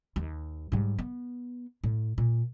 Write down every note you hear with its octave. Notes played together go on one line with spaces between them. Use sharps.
D#2
G#2 G3
B3
A2
A#2